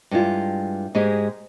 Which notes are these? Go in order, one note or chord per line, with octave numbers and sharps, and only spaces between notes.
G2 G#3 E4 F4
G#2 G#3 G4 G#4 D#5